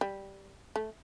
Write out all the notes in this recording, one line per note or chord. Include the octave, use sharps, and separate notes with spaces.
G3
A3